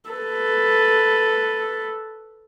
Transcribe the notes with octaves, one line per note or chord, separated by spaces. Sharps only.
A4 B4